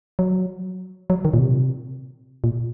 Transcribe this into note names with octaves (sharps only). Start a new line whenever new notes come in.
F#3
F#3
D#3
A#2
C3
A#2